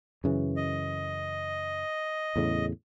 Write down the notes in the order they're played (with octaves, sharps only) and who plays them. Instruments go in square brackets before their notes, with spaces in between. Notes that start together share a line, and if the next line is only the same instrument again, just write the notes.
[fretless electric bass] F#2 C#3 E3
[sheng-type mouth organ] D#5
[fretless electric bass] E2 A2 C#3